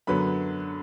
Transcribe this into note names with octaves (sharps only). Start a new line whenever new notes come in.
F#2 D3 F#3 B3 B5